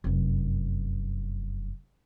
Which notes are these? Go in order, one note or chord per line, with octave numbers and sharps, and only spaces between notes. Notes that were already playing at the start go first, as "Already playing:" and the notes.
F1 F#2